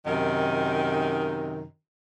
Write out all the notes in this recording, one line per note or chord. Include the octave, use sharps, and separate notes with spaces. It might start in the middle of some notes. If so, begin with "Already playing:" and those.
F#2 C3 D#3